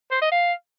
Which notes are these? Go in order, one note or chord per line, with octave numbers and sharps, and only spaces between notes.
C5
D#5
F5